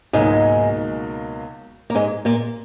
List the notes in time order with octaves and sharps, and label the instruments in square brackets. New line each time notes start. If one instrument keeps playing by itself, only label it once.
[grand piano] C#2 B2 F#3 A#3 D#4 [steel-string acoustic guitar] G#2 G#3
[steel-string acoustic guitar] A#3
G#2 G#3
A#2 A#3